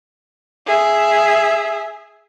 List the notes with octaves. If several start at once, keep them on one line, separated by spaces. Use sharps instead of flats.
G#4 E5